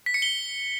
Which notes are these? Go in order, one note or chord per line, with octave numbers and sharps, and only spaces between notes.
B6
C#7
G7